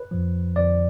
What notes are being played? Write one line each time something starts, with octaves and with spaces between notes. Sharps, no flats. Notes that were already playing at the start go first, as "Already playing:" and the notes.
Already playing: B4
F2 F3
F2 D3 F3 D5